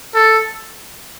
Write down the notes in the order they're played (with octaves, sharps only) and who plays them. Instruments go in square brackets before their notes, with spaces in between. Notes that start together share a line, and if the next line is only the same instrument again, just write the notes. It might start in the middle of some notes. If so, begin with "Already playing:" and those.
[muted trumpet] A4